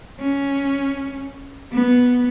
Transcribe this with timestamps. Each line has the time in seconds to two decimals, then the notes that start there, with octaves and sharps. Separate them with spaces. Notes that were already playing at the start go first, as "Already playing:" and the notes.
0.20 C#4
1.73 B3